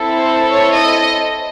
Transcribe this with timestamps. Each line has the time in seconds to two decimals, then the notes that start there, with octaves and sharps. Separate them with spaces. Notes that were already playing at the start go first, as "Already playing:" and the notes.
Already playing: C4 E4 A4
0.18 C5
0.48 C#5
0.79 D#5